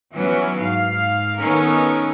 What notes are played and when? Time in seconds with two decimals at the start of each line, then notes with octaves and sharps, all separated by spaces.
0.14 E3 F#3 B3 C#4
0.57 G#2 F5
1.40 D#3 B3 C#4 D#4 A4 A#4